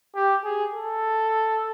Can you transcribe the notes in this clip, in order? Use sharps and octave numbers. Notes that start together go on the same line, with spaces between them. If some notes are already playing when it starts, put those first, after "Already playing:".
G4
G#4
A4